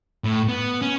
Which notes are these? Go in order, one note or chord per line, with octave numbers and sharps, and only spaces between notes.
A2
B3
C#4